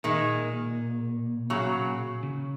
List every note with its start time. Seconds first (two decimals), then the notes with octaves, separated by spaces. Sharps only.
0.04 A#2 D#3 G#3
1.50 C#3 F#3
2.23 C#3